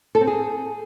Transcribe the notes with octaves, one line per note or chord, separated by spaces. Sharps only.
A4
C4
G#4